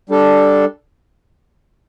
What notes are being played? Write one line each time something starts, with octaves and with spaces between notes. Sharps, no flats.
G3 D4 A4